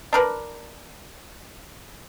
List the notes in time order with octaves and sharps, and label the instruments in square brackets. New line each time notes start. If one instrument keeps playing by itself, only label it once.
[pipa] D4 A#4 B4